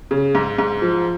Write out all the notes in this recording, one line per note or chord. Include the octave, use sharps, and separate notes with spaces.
C#3
G#2
G#2
F3